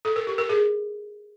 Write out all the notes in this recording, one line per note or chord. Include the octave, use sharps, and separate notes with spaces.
A4
A#4
G4
A#4
G#4